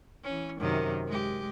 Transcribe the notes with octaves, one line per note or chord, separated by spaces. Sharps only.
E3 C#4
F#2 C3 D#3
G#3 G4